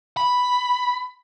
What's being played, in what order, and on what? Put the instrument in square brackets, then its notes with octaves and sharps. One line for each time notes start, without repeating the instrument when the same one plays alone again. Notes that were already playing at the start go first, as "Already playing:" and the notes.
[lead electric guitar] B5